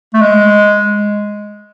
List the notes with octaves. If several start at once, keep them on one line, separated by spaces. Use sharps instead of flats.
A3
G#3